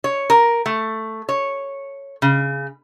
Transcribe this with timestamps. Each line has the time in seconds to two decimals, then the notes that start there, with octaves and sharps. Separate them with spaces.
0.04 C#5
0.30 A#4
0.66 A3
1.29 C#5
2.22 C#3